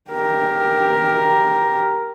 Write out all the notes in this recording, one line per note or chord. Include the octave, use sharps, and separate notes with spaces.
G4 A#4